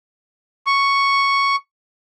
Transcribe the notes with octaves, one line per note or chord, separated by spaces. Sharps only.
C#6